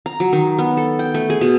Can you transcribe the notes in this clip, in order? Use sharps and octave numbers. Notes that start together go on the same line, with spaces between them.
A#5
F#3
D#3
B3
A4
G5
A3
G#4
B2